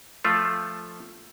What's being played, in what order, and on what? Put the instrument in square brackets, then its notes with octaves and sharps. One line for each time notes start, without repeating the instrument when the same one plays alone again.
[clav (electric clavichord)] F3 A3 F4